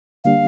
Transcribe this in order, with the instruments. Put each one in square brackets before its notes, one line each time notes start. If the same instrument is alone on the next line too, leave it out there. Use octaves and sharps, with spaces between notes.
[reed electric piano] D3 G3 A#3 D4 G4 [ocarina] F5